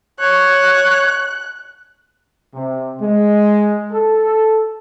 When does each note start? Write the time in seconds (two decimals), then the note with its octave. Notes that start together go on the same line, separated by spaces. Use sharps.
0.20 C#5 F#6
2.53 C3
3.00 G#3
3.91 A4